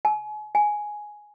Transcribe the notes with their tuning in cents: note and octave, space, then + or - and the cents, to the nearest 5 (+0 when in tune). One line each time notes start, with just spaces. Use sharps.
G#5 +35
G#5 +5